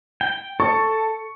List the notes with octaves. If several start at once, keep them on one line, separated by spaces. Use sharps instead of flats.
G5
A4 C#6